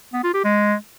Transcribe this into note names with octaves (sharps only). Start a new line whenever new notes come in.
B3
F4
G4
G#3